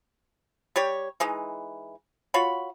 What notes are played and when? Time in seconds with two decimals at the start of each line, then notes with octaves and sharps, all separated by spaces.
0.76 G3 G4 C#5
1.20 E3 G#3 D#4
2.34 F4 F#4 C#5 B5